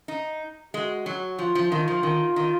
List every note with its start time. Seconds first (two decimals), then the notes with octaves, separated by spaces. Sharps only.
0.08 D#4
0.74 G#3 F#4
1.06 F#3
1.38 F3 F4
1.55 F3
1.71 D#3 F4
1.88 F3
2.03 D#3
2.36 D#3